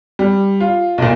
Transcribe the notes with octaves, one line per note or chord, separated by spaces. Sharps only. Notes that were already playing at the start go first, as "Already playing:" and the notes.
G3
F4
B1 A#2